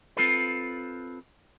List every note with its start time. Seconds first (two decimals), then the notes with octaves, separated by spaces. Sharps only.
0.17 C4 F4 A4 B4